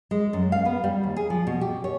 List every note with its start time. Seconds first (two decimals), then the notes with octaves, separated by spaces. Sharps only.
0.11 G#3
0.33 F#2
0.52 F5
0.65 B3
0.84 G3
1.03 D#2
1.16 G#4
1.30 F3
1.47 B2
1.61 G4
1.84 C#5